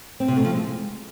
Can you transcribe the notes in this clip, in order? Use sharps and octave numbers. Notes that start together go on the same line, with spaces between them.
C4
C3
A3
F3
G#3